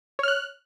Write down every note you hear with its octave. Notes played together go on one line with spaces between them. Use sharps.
C#5 F6 F#6